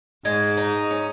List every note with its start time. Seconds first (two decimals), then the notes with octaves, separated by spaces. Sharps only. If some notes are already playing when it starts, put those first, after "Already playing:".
0.25 G#2 G#3
0.57 D#4
0.91 C#4